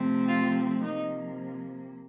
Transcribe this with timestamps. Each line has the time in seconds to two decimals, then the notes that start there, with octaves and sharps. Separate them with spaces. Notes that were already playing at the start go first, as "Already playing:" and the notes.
Already playing: C3 F3 A3 C4
0.28 F4
0.82 C3 F3 A#3 D#4